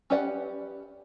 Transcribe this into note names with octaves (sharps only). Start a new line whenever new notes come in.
C#4 G4 B4 D5 F#5